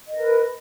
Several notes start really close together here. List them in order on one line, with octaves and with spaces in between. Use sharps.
D#5 A#4 B4